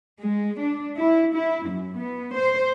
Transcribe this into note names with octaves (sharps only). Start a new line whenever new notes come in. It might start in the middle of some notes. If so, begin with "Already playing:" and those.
G#3
D4
E4
E4
F#2
B3
C5